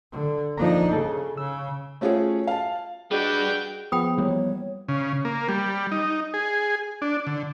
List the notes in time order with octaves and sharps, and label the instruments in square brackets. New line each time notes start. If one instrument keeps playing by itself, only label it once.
[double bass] D3
[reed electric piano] F3 A#3 A#5 [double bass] D4 D#4
[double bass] C#3 [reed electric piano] G#4 A4
[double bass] C#3 [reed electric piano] E6
[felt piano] A3 C#4 F4 F#4 G#4 C#5
F5 A5
[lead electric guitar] G3 B4 [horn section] D4 F#4 [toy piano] G#4 D#5 [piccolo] G5
[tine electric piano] F3 B3 [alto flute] G#4 [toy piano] G5 B5 D#6
[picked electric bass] E3 G3 A#3 [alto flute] C#5
[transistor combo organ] C#3
A#3
G3
D#4
G#4
D4
D3